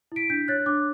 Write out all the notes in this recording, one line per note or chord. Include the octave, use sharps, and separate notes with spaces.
E4 B6 D7
D4 G6 B6
C#5 F#6 A6
D4 D6 F#6